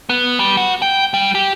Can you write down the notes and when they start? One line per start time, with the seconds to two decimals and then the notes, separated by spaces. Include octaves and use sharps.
0.09 B3
0.39 G3
0.57 F#4
0.82 G5
1.14 G3
1.35 G4